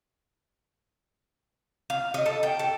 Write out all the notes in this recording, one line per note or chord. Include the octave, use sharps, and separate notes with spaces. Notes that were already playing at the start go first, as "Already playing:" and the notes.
F5
D#5
A4
G5
A4